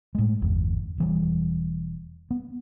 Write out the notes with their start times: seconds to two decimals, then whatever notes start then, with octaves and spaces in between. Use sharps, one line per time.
0.15 A2 G#3
0.42 G1 E2
0.98 E1 E3 G3
2.31 B3